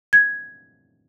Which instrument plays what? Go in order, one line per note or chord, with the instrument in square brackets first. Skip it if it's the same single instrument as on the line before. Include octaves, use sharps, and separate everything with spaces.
[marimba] G#6